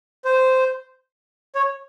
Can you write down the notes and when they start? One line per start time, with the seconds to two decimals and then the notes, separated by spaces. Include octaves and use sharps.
0.25 C5
1.55 C#5